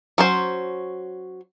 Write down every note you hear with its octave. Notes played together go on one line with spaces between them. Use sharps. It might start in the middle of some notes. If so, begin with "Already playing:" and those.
F#3 C#4 C5